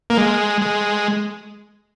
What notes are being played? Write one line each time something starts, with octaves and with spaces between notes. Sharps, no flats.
A#3
G#3
G#3